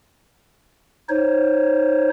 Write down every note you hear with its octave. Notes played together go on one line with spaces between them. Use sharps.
D#4 C5 C#5